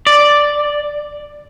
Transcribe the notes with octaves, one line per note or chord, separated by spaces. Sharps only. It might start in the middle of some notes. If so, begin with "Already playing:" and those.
D5